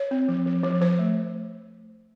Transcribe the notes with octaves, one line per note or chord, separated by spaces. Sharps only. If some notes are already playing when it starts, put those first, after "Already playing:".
Already playing: C#5
C4
F3
F3
F3
F3 C5
A3